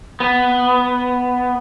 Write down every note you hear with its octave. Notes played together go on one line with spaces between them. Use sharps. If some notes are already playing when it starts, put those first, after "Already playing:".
B3